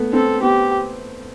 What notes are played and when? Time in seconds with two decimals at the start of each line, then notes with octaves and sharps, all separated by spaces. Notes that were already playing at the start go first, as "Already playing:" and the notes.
Already playing: A3 B3
0.13 C4 A4
0.42 B3 G4